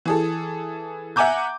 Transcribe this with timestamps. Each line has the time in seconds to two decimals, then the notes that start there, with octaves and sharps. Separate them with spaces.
0.05 E3 G#4 A4
1.16 E5 F#5 G#5 A#5 D6 G6